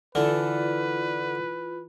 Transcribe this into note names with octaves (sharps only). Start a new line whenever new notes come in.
D3 E3 F4 A4 B4